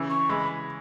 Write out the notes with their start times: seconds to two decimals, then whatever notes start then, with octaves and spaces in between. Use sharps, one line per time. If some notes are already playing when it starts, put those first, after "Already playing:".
Already playing: C#3 E3
0.10 C#6
0.29 E3 G#3 B5